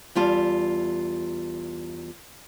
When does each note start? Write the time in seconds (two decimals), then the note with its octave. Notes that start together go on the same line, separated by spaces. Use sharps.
0.15 E2 G3 F4 A5